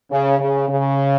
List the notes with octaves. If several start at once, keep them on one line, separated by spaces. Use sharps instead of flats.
C#3
C#3
C#3